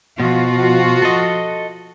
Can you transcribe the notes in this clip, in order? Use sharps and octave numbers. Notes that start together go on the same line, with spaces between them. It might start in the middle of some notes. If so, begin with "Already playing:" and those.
B2 F3 F4 F#4
A4 D#5